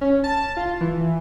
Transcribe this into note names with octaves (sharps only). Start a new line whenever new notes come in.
C#4
A5
F4
E3